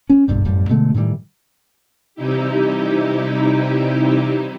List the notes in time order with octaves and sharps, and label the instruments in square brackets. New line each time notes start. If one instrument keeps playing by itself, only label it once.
[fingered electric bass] C#4
F#1 B1 G2 G3
A1 F#2 F3 G3
B2 D3 G#3 A3
A2 D#3 E3 G3
[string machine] C3 E3 G3 D#4 E4 G4